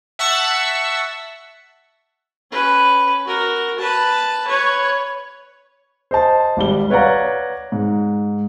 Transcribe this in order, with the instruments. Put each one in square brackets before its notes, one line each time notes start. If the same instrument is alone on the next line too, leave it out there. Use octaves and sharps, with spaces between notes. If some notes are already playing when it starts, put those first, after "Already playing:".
[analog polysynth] E5 F#5 A5 C#6 E6
[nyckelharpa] C#4 B4
F#4 A#4
B4 A5
B4 C#5
[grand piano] C5 D#5 A5
G#1 G3 G7
B4 C#5 D5 F5 F#5 A#5
G#2